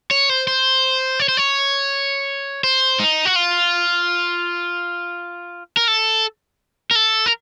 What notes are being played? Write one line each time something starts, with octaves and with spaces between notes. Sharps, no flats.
C#5
C5
C5
C#5
C5
C#5
C5
D#4
F#4
F4
A#4
A4
A#4
A4
A#4